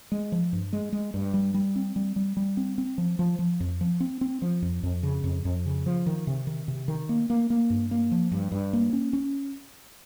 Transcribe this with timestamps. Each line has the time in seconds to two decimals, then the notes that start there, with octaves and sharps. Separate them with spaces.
0.12 G#3
0.32 F3
0.53 G2
0.73 G#3
0.92 G#3
1.14 G2
1.34 G3
1.54 G3
1.76 C4
1.96 G3
2.16 G3
2.37 G3
2.57 C4
2.78 C4
2.98 F3
3.19 F3
3.39 F3
3.60 F2
3.81 F3
4.00 C4
4.21 C4
4.42 F3
4.62 F2
4.83 F2
5.03 C#3
5.24 F2
5.45 F2
5.66 C#3
5.86 F3
6.06 D#3
6.27 C3
6.47 D#3
6.68 C3
6.88 D#3
7.09 A#3
7.30 A#3
7.50 A#3
7.70 G2
7.91 A#3
8.11 F3
8.32 G2
8.52 G2
8.73 A#3
8.93 C#4
9.13 C#4